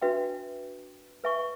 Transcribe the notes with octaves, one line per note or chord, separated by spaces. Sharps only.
D4 F#4 B4 E5 G5
B4 E5 G#5 C#6